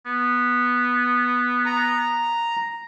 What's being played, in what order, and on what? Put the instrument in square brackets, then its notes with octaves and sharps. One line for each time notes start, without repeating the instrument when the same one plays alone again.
[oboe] B3
[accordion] A#5